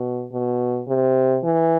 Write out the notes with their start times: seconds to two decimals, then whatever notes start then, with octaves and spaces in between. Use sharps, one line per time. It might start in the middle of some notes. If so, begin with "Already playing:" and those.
Already playing: B2
0.32 B2
0.88 C3
1.44 E3